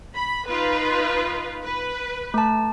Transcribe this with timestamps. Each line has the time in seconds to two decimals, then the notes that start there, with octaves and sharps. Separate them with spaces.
0.16 B5
0.49 D#4 F4 B4
1.63 B4
2.34 A3 A5